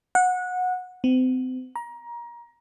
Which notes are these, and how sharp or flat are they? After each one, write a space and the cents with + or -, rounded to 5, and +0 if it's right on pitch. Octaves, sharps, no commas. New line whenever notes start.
F#5 -20
C4 -35
A#5 +25